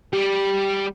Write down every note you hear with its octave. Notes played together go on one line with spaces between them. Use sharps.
G3 G4